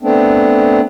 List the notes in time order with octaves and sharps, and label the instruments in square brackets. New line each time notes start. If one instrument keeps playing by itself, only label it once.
[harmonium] A3 B3 C4 D4